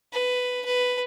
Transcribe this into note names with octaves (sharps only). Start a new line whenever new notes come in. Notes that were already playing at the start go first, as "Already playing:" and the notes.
B4
B4